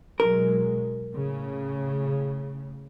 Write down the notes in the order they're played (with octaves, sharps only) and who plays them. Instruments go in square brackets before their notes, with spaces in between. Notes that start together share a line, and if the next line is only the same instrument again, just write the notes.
[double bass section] B2 F#3 G#3 [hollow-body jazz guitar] A#4
[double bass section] A2 C#3